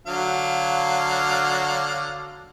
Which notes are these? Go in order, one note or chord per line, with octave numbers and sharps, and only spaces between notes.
D3 F#3 F5